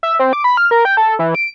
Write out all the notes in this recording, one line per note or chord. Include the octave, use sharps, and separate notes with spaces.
E5
C4
D6
B5
F6
A#4
G5
A4
E3
D7